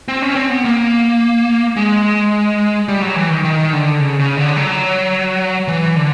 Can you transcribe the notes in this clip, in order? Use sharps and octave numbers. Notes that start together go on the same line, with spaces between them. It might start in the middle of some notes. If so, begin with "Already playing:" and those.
C4
C#4
C4
B3
A#3
G#3
G3
F#3
E3
D#3
D#3
D3
C#3
C#3
D3
F#3
E3
D3